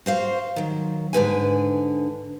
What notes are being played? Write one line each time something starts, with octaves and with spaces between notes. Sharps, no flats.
F#4 C5 F5
D#3 F#3
G#2 D3 B4 G#5